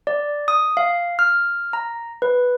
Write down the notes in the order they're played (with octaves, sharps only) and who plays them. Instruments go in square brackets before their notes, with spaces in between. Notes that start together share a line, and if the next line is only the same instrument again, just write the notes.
[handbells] D5
D#6
F5
F6
A#5
B4